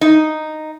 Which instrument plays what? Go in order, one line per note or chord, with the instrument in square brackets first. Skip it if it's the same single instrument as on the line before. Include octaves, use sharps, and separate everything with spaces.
[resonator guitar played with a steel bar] D#4